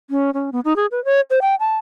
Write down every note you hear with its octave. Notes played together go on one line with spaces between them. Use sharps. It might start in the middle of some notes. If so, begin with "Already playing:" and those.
C#4
C#4
B3
D#4
G#4
B4
C#5
C5
G5
A5